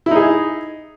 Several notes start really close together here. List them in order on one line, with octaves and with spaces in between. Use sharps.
E4 D#4 G#4